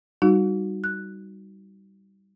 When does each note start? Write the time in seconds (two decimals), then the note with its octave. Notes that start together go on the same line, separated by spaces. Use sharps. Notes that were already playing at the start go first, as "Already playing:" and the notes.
0.22 G3 D#4 F#4
0.84 F#6